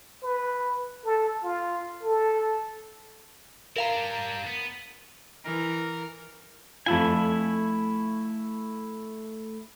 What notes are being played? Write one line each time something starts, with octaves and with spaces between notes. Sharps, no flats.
B4
A4
F4
A4
E4 F4 A#4 F5 A#5
G3 D4
B3
E3 A#4
F2 A3 E4 F4 G#5